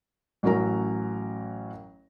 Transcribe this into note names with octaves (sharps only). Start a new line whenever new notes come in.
A1 F#3 C#4 A#4 A#5